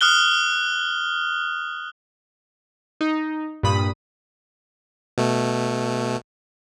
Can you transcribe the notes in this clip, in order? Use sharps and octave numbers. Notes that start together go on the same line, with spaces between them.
D#6 F6 F#6 G7
D#4
G2 A#2 B5 D#6
B2 A3